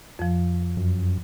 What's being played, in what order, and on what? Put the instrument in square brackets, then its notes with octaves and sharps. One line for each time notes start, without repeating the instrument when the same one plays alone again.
[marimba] F2 F3
[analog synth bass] F#2